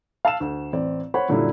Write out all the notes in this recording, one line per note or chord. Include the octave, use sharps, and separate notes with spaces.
F5 A5 E6 E7
D2
A1 C4 D5
C5 C#5 F#5 B5
F#2 A#2 D3 F#3 G3 E4